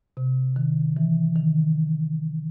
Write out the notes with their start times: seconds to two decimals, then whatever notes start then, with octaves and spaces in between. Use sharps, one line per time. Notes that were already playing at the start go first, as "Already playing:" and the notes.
0.17 C3
0.56 D#3
0.97 E3
1.36 D#3